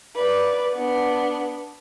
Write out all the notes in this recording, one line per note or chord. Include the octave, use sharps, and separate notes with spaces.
B4 D5
B3 D4